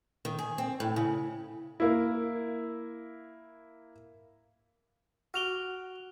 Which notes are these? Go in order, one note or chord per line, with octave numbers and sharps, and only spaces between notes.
D#3
G#4
C4
A2
C#3
A#3 E4
F#4 D6 F6 F7 G7